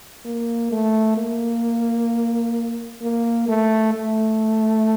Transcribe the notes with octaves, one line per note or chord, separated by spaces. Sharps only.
A#3
A3
A#3
A#3
A3
A3